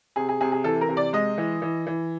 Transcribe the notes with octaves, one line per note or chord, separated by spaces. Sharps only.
C3 G#4
G#4
C3 G#4
G#4
E3 A4
A#4
C3
D5
G#3 D#5
E3
E3
E3